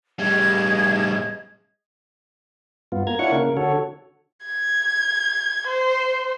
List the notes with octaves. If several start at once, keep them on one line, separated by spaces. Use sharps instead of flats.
A2 G3 G#4 D#5 G#6
G2 B3 F4
A#3 A#5 G#6
D4 E4 F4 C#5 F#5 C#6
C#3 A#3 A#4
D3 F#4 A4 C#5
G#6
C5